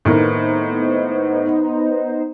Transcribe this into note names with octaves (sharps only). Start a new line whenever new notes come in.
A2 D#3 A#3 B3 D#4 C5